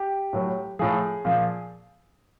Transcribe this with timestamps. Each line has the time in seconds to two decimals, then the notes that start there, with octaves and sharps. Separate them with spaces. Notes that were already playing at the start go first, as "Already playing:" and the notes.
Already playing: G4
0.33 A2 F#3
0.79 A2 F3 G#4
1.25 A#2 F3